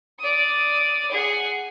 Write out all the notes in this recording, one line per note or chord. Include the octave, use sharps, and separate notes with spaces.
D5 D#6
G#4 F#5